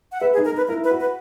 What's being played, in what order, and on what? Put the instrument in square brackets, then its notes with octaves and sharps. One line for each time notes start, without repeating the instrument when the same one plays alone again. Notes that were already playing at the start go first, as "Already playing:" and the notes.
[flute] F#5
[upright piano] B4 [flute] E5
[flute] G#4
[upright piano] D#4
[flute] A#4
[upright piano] D#4 [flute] B4
[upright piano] E4 [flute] A#4
[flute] B4
[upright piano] F#4
[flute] B4